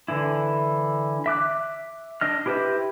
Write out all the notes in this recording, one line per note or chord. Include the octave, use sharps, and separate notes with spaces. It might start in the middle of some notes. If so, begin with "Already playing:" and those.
D3 E3 E4
E5 D6 F#6
D4 D#5 F6
E4 G4 B4 C5 E5